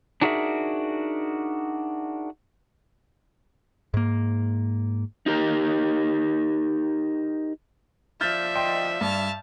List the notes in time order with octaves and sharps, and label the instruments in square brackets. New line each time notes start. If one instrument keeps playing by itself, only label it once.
[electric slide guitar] D4 D#4 F#4 G#4 A#4 E5
[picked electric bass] G#2 A#3
[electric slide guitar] D#4 G4 A#4
[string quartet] F3 [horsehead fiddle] D5 E5 [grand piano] F6 G6 A6
[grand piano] D#5 G5 C6
[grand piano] G2 [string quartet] A5 F6